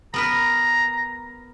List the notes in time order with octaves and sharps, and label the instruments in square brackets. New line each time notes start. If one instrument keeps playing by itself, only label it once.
[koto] B3 A#4 B4 [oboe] A#5